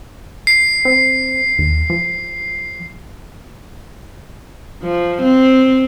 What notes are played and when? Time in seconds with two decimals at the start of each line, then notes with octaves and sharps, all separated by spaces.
0.47 C7
0.85 C4
1.59 D#2
1.90 F3
4.83 F3
5.23 C4